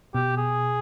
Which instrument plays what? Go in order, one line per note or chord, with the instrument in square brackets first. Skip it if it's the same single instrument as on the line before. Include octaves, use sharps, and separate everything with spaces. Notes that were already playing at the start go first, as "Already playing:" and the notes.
[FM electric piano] B2 [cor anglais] G4
[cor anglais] G#4